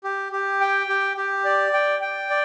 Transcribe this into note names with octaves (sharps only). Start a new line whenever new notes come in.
G4
G4
G5
G4
G4
D5
G5
G5
D5